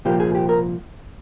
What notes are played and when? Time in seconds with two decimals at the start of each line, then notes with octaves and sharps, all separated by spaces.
0.05 C2 A#2 F3 A#3 G4
0.20 G#4
0.35 G4
0.49 A#4